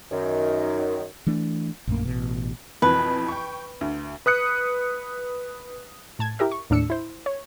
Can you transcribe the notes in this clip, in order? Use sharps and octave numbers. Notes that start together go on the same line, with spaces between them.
F#2 D#3
E3 A3 D4
A#1 F#2 A3 A#3
A1 B2
F2 B2 E3 B4
G5 C#6
D2
B4 D#6 F#6 C#7
A2 A5 G#6
E4 G4 A#4 E5
C#6
D#2 A2 D4 E6 C#7
E4 C5
C#5